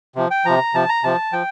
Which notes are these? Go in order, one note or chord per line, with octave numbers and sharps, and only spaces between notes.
C3 F3
G5
C3 F3 A#5
C3 F3 A5
A#5
C3 F3 A5
F3 G5